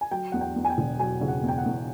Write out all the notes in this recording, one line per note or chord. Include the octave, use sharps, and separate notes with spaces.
G#5
F#3 G5
E2 F#5
G5
E2
G#5
G5
E1
F#3 G#5
C#3
F#5
E2
G5
F#5
E2